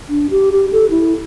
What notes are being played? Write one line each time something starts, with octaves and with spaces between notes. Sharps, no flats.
D4
G4
G4
A4
E4